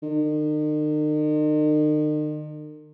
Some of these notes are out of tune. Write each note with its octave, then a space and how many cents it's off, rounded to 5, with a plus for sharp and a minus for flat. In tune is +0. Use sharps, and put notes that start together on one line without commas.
D#3 -45